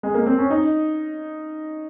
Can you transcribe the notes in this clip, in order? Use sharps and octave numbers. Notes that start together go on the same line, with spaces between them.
G#3
A#3
C4
C#4
D#4